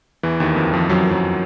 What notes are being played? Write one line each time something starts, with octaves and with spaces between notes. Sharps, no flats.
E2 E3
D#2 D#3
F2 F3
F2 F3
F#2 F#3
F#2 F#3